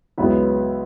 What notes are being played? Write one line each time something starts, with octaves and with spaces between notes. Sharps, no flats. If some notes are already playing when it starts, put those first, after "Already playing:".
C#2 C#3 F#3 B3 E4 B4